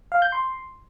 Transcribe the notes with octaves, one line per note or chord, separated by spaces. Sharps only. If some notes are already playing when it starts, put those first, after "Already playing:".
F5
G6
C6